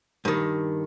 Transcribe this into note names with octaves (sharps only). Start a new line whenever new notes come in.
G2 D#3